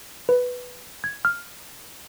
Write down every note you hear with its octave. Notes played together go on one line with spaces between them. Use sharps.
B4
G#6
F6